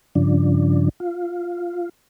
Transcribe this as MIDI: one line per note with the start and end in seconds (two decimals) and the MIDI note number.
0.15 0.89 43
0.15 0.89 49
0.15 0.89 53
0.15 0.89 62
1.00 1.89 65